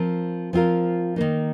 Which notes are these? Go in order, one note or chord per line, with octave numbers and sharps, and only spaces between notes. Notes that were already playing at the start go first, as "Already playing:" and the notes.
Already playing: F3 C4 F4 A#4
F3 C4 F4 A#4
D#3 A#3 D#4